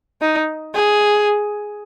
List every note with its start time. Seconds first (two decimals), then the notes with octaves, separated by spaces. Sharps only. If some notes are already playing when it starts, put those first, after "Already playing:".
0.21 D#4
0.74 G#4